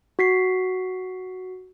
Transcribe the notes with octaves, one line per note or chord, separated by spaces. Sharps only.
F#4 B6 C7